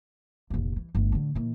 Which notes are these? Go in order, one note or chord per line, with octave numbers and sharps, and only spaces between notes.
F1 A#1
E3
G1 A3
A2 D3
A#2 E3